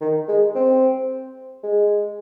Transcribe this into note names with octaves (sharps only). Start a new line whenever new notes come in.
D#3
G#3
C4
G#3